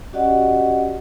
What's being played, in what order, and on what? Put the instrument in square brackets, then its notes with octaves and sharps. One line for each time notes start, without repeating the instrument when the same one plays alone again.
[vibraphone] C#4 F#4 G4 D5 D#5 F#5